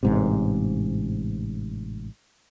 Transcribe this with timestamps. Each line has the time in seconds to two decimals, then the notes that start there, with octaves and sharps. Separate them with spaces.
0.03 A1 G#2 C3